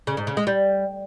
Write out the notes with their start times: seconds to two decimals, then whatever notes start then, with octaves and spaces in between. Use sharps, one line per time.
0.07 C#3
0.17 G#2
0.27 C#3
0.37 G#3
0.47 G3